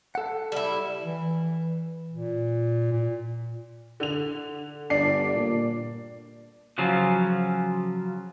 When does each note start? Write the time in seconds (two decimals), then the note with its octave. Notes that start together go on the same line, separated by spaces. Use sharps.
0.15 A4 F#5
0.52 G3 E4
1.05 E3
2.12 A#2
2.92 A#2
4.00 D3 F7
4.90 G1 D4 C7
5.36 A#2
6.78 C#3 F3 F#3 C#4 F4